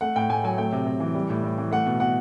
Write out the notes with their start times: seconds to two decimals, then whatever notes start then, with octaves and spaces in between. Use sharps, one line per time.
0.01 A3 F#5
0.16 A2 G5
0.30 A2 G#5
0.44 F#3 G#5
0.58 A3 G5
0.72 C3
0.87 C3
1.00 E3
1.15 G3
1.30 A2
1.43 A2
1.58 E3
1.71 A3 F#5
1.87 B2
2.00 B2 F#5